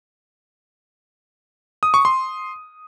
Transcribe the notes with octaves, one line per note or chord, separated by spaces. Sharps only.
D#6
C#6
C6